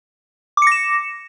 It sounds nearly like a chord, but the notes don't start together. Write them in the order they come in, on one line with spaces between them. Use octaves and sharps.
D6 C#7 A#6 E7